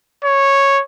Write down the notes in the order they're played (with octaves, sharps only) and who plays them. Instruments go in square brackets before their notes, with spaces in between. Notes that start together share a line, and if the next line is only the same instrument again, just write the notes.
[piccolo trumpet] C#5